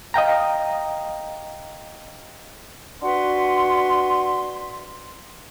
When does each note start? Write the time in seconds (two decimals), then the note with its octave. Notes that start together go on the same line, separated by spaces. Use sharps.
0.14 D#5 F5 G5 A#5
3.02 D4 F#4 B4 F#5 C6